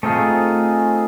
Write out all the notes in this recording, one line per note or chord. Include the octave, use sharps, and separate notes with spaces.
A3 C4 D#4 F4 G#4